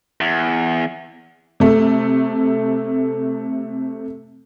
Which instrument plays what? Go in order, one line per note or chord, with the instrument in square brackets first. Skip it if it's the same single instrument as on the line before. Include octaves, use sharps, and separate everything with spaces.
[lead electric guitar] E2
[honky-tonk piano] C3 A3